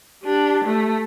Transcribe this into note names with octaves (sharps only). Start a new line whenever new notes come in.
D4 G4
A3